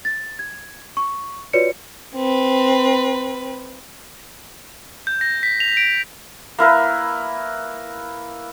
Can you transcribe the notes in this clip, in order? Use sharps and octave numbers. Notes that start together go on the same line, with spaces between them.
A6
G#6
C#6
F4 F#4 B4 C#5 D5 C#7
C4 B4
G6
A#6
B6
F7
D7
A#3 E4 A#4 B4